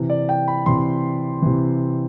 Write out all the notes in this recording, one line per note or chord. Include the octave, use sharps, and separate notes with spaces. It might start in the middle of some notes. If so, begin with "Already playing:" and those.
Already playing: C3 E3
D5
G5
B5
C3 E3 C6
C3 E3